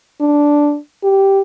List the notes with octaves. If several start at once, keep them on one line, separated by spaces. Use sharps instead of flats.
D4
G4